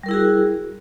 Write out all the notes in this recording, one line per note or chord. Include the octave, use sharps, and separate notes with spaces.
G3 E4 F#4 G#4 A#4